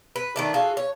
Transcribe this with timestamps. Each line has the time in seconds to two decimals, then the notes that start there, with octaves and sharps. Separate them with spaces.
0.16 B4
0.36 D#3 A3 D4
0.54 F4 F#4 G#4 A4
0.77 C#5